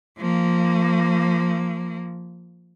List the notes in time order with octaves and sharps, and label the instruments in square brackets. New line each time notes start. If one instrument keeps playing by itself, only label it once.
[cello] F3 A#3